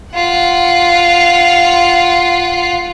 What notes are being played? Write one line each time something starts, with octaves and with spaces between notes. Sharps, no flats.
F4 F#5